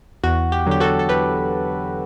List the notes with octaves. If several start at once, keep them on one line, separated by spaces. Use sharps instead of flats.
E2 F#4
G4
D3 F#3 G4
F#4 A4
A4
E2 G4 B4